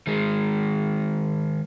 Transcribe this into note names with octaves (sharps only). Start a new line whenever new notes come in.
D#3 G#3